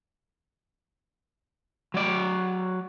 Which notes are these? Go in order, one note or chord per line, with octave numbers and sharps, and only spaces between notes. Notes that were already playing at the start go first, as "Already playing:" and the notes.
F#3 D5